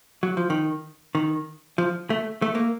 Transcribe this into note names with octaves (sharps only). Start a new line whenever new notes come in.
F#3
F3
D#3
D#3
F3
A3
A3
A#3